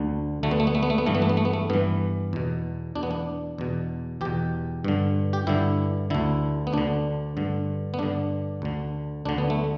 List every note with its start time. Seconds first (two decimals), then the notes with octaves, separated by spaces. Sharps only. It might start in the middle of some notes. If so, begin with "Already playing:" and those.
Already playing: D2 D3
0.43 D2 D3 A3
0.51 B3
0.60 A3
0.67 B3
0.75 A3
0.83 B3
0.90 A3
0.98 B3
1.06 G2 E3 A3
1.15 B3
1.22 A3
1.29 B3
1.37 A3
1.45 B3
1.53 A3
1.70 G2 E3 B3
2.33 E2 B2
2.96 E2 B2 D4
3.03 B3
3.11 D4
3.58 E2 B2
4.21 E2 B2 G4
4.84 G2 D3
5.33 G4
5.47 G2 D3 E4
6.10 D2 D3 E4
6.67 B3
6.73 D2 D3 D4
7.37 G2 D3
7.94 B3
7.99 G2 D3 D4
8.62 D2 D3
9.25 D2 D3 D4
9.38 B3
9.50 A3